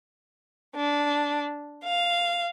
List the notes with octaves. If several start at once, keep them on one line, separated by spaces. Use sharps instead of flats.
D4
F5